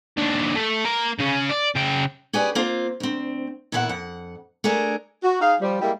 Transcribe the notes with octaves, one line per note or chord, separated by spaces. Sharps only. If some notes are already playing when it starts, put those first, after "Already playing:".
D#2 D4
A3 A4
A#3 A#5
C#3 C#4
D5
C#3 G5
C#4 G4 G#4 B4 D5
A#3 C4 F4 C5
D2 C4
A#2 E3 B3 E4 C5 F#5
F2 F#5
A3 D4 G#4 A#4
F#4
D#4 G#4 F5
F3 G3
G3 G#3 A#3 E4 G4